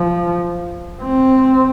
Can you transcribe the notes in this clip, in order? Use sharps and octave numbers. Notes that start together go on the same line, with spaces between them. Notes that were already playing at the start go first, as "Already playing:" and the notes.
Already playing: F3
C4